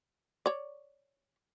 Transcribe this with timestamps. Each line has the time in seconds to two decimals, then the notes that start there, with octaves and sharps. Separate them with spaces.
0.46 C#5 D5